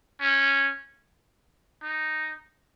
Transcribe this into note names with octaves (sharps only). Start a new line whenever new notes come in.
C#4
D#4